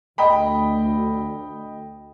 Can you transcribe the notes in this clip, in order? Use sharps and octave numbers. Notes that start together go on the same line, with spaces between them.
D2 D#5 G5 B5